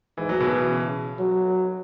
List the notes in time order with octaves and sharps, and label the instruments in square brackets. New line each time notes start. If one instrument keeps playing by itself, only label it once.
[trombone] G#2 [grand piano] E3
[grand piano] F#3
B2 E3
[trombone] C#3
F#3